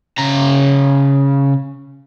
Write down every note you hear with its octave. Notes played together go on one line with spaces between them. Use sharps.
C#3 A#5